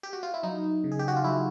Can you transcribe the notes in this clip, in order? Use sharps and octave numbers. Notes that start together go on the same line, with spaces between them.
G4
F#4
F4
E4
F#3 D#4
C#3
G#4
G4
F#4
F4
F#3 E4